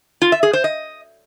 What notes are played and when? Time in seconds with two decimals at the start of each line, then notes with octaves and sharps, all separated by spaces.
0.22 F4
0.32 E5
0.43 G#4
0.53 C5
0.64 D#5